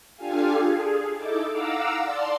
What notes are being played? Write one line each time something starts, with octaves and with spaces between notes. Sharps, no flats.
D4 F4 G4 A4 F5 G#5
G#4
D#4 E4 A4 D6
F5 F#5 A#5 D6 E6
D5 A5 C6